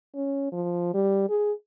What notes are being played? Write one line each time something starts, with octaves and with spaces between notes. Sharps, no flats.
C#4
F3
G3
G#4